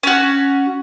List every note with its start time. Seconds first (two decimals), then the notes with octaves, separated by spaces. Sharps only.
0.03 C#4 F#4